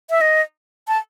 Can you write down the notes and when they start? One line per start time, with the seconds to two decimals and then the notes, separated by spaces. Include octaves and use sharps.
0.10 E5
0.21 D#5
0.88 A5